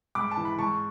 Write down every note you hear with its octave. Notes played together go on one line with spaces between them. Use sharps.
G#2 B5 D6
A5
E3
B5
G#2 A5 C#6